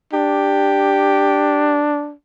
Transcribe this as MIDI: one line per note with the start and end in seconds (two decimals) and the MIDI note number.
0.13 2.14 62
0.13 1.84 67